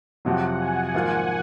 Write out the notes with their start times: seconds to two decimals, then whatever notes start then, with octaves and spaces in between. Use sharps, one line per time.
0.25 F2 C3 F#3 F#5
0.60 G#5
0.94 G#1 G#2 F3 A#3 F4 F#5